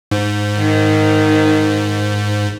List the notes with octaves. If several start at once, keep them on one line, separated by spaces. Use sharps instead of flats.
G#2
D#3